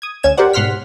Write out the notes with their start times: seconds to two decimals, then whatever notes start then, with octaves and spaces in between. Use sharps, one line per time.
0.02 D#6 G#6
0.23 D2 C#4 G#6 E7
0.38 G4 A#4 C5 D5 F#5
0.53 B1 G#2 F#5 C6 F6 B6